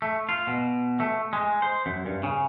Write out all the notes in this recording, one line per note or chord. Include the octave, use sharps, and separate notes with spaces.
A3
F4
B2
A3
G#3
C5
F#2
G2
C#3